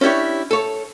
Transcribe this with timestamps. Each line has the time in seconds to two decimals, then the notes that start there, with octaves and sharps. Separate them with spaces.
0.01 C#4 D4 E4 G4 C#5
0.51 A4 C#5